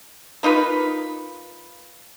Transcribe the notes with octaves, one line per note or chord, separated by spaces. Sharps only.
A#3 D#4 F4 B4